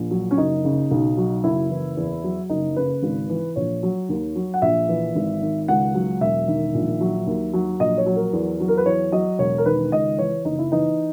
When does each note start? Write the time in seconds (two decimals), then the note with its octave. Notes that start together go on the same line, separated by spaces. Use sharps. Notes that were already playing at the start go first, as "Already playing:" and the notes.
Already playing: A#1
0.11 F#3
0.31 C#4
0.38 F#1 D#4
0.65 C#3
0.91 B1
1.17 F#3
1.44 F#1 E4
1.70 E3
1.97 E2
2.24 F#3
2.50 F#1 D#4
2.76 C#3 B4
3.03 G#1
3.29 E3
3.56 A#1 C#5
3.83 F#3
4.09 D#2
4.36 F#3
4.54 F#5
4.62 A#1 E5
4.89 E3
5.15 G#1
5.41 D#3
5.68 C#2 F#5
5.94 F#3
6.21 E1 E5
6.48 D#3
6.74 A#1
7.01 F#3
7.27 D#2
7.54 F#3
7.80 A#1 D#5
7.98 C#5
8.06 F#3
8.16 A#4
8.33 E2
8.60 F#3
8.68 A#4
8.77 B4
8.86 E2 C#5
9.12 F#3 D#5
9.39 E1 C#5
9.58 A#4
9.66 D#3 B4
9.92 C#2 D#5
10.19 E3 C#5
10.45 F#1 D#4
10.59 E4
10.72 E3 D#4